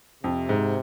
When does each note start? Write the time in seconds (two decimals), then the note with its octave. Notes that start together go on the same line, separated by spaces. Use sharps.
0.23 F2 C3
0.49 G#2